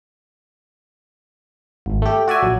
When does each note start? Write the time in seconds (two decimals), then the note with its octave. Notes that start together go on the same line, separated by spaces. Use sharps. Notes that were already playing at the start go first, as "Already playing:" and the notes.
1.86 G#1
2.02 A3 G4
2.28 F#4 D5 E5 G#5
2.42 A#1 F#3